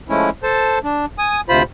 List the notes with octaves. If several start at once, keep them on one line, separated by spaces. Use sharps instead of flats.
F3 G#3 A3 C#4 E4
A4 C5 A5
D4
G#5 D#6
D2 C3 F4 C5 B5